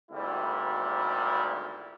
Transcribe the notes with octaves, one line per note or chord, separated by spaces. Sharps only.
G#1 D2 A#2 G3 E4